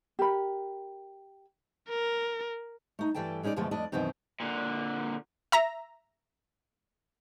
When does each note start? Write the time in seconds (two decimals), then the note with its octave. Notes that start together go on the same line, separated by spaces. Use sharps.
0.19 G4 A#4 B5
1.89 A#4
2.99 A3 D#4
3.14 G2 E3 G3 A4 G5 A5
3.43 G#3 C#4 D#4 A4 D5
3.56 F#2 B2 D3 F3 G#3 A3
3.71 F2 A3 D4 D5 D#5
3.92 F#2 B2 D#3 E3 C4 D#4
4.40 A#2 D3
5.52 E5 A#5